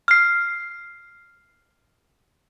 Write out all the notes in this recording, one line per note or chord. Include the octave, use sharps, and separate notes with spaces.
F6 C7